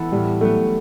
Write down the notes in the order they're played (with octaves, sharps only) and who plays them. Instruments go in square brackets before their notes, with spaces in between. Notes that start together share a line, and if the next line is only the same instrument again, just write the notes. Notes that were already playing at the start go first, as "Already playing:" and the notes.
Already playing: [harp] E3 B3 E4 A4
[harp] A2 [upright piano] G3
[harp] F#3 B3 [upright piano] A3